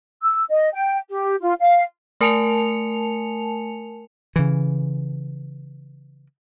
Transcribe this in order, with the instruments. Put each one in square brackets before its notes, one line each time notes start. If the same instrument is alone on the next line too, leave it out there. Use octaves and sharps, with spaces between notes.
[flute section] E6
D#5
G5
G4
F4
F5
[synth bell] A3 A#4 G#5 A5 C#7 F7
[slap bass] C#3 E3